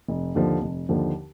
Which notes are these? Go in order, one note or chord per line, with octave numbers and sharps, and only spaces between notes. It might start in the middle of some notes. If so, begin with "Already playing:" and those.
F1
D#2 D3 F3
F1
D#2 D3 F3